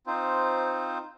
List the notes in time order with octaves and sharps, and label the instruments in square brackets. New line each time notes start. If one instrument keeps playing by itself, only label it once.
[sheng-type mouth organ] C4 D#4 F4 C5